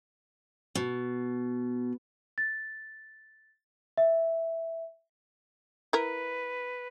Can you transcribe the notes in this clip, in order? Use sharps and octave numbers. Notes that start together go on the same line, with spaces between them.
B2
A6
E5
E4 A#4 B4